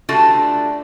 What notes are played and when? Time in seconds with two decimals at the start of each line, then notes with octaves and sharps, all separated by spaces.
0.09 D3 G3 A3 D4 F4 F#4